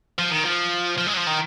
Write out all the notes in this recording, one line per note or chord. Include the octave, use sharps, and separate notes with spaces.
F3
D#3
F3
F3
G#3
F#3
F3
D#3